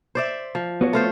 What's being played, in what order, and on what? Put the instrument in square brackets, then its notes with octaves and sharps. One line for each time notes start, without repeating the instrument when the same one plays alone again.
[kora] C5 D5 E5
F3
[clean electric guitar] B3 F#4 C#5
[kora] A3 F4 C5